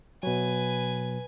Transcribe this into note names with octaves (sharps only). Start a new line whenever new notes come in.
B2 F#3 B4 G#5